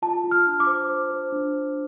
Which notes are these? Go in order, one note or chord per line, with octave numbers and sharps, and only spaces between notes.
F4 A5
F4
F6
D4
D6
C5
C5
C5
D4
C5